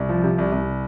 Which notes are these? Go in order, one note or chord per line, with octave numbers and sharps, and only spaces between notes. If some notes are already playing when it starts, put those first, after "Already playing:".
Already playing: C2
F3
C3
C2
C2